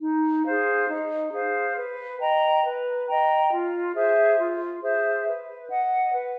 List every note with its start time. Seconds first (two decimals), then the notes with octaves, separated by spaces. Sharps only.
0.01 D#4
0.45 G#4 C5 F5
0.89 D#4
1.32 G#4 C5 F5
1.76 B4
2.20 D#5 G5 A#5
2.64 B4
3.08 D#5 G5 A#5
3.51 F4
3.95 G#4 C5 E5
4.39 F4
4.82 G#4 C5 E5
5.26 B4
5.70 D#5 F#5
6.13 B4